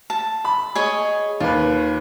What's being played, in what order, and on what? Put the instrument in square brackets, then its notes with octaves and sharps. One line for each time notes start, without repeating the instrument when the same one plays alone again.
[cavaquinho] A5
[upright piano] B5
[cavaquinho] G#4 C#5 D#5
[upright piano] D#2 B4 [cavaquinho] F4